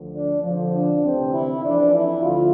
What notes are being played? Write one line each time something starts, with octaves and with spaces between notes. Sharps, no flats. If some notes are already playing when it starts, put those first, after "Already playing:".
Already playing: D2 D3 F3
D4
F2 D3 F3
D4
D2 C3 E3 C4
E4
F2 E3 D4
E4
D2 D3 F3 F4